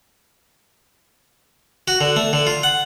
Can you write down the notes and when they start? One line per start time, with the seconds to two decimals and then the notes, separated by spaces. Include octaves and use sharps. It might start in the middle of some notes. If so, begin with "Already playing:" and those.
1.88 F#4
2.01 D3
2.16 A3
2.33 D3
2.47 F4
2.63 F#5